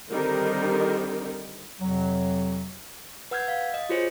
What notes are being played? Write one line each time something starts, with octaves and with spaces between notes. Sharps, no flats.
D3 D#3 G3 C4 D#4 A#4
F2 C3 F#3
B4 F#5 E6 F6 G6 G#6
F5
D#5
F4 F#4 G#4 C5 C#5